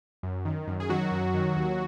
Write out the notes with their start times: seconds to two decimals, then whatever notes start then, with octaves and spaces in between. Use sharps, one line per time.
0.23 F#2
0.45 D#3
0.67 F#2
0.80 G#4
0.89 D#3 F#3 F#4
1.11 F#2
1.34 D#3
1.56 D#2